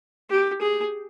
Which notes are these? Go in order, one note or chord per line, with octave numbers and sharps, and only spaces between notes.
G4
G#4